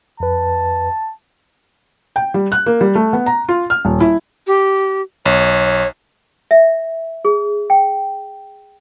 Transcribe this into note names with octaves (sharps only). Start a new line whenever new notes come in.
F2 B4 A5
G5
G3
F#6
A#3
G3
A3
B3
A#5
F4
F6
D#1
E4
G4
B1 C#5
E5
G#4
G5